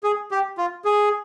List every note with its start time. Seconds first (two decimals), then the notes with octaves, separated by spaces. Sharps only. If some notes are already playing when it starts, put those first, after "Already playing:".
0.03 G#4
0.31 G4
0.58 F4
0.85 G#4